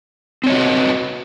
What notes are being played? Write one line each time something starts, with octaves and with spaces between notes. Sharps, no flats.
C4 F#4 B4 C#5 D#5